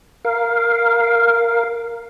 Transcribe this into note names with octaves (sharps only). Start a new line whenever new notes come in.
A#4 F5